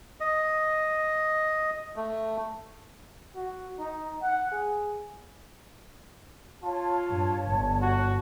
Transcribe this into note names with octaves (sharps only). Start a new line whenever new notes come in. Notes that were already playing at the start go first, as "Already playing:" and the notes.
D#5
A3
F#4
D#4
F#5
G#4
F4 C#5 A5
G2
G1
F#4